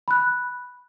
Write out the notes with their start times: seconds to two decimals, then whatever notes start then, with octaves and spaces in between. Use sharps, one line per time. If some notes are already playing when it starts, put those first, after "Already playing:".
0.08 B5 F#6